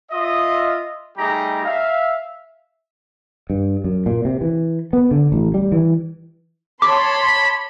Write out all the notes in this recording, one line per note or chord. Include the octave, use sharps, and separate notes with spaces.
F4 D#5 E5
G3 A3 D#4 G4 G#4 A#5
E5 F5
G2
F#2
A#2
C3
E3
B3
D3
A1
G3
E3
C#5 A5 B5 C6 D6